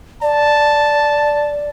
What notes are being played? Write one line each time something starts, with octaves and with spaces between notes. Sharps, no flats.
D5 A5